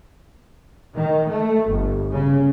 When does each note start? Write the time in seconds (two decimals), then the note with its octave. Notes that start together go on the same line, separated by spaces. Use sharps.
0.97 D#3
1.28 A3
1.70 G1
2.12 C#3